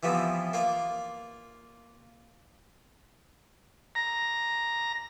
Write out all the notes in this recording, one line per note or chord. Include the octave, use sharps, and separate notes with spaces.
E3 F3 G3 B3 C4
A#3 F4 D5
A#5